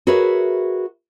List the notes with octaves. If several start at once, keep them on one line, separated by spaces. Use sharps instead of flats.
F#4 G#4 A#4 B4 C#5 E5